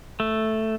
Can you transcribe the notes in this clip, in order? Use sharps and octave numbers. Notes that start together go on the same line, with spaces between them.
A3